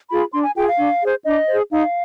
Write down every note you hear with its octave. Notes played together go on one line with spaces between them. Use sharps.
F4 G#4 B5
D4 C6
G#5
F4 G#4 G5
F5
D4
G#4 C5
D4 D#5
G#4 C5
D#4 F5